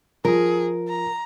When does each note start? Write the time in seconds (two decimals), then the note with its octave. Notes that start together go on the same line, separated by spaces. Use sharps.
0.25 F3 G#4 A#4
0.88 A#5